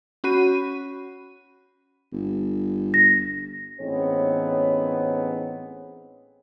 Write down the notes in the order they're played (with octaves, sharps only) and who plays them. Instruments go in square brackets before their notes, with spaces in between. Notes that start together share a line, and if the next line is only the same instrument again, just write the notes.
[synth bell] C#4 F#4 B5 D#7
[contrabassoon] G1
[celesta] A#6
[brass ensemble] A1 B3 C4 D#4 G#4 C#5